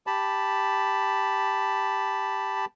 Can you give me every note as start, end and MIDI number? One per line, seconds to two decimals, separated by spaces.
0.07 2.65 67
0.07 2.65 81
0.07 2.65 83